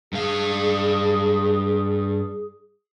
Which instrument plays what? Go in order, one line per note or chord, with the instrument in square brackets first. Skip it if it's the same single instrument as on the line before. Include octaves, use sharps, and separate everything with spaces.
[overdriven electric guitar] G2 F5 [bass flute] G#4